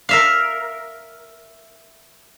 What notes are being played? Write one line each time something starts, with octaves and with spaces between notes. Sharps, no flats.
A#4 E5 F5